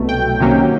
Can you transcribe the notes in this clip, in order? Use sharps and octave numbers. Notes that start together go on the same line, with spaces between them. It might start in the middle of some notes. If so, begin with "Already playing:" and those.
Already playing: C2 B2 F#3 A3
G5
C3 D#3 F#3 A#3 C#4